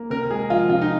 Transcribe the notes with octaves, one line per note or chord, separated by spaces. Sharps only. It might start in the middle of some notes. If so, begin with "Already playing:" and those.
Already playing: A#3
C3 A#4
G#3 G#4
F3 F4
C3 F4
D#4